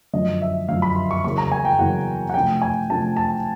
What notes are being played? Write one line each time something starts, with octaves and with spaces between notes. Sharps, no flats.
F#2 D3 F3 D#5
E5
F#2 D3 F3 F5
B5
C6
C#6
E2 C#3 F#3 A#3 C#6
A#5
G#5
G5
E2 C#3 F#3 A#3 F#5
F#5
C3 F3 A3 D4 G5
G#5
C3 F3 A3 D4 A5
A5